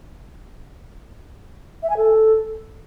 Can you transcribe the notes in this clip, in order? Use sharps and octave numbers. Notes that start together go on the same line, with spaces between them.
E5
G#5
A4